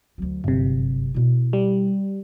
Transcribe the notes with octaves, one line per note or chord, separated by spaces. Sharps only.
D2 F#3
G1 F#2 C3
B2 E4
G3